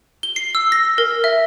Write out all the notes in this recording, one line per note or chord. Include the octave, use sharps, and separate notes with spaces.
G7
C7
E6
A#6
A#4
E5